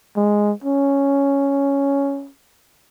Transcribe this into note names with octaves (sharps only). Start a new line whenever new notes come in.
G#3
C#4